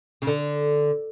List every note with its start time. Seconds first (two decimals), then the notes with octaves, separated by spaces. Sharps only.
0.22 C#3
0.27 D3